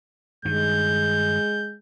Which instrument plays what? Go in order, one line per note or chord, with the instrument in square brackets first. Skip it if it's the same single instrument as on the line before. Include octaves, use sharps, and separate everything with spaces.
[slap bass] G2 D#3 [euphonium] G#3 [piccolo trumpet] G6